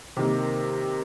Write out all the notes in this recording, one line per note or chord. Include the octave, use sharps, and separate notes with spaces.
C3 D#3 A#3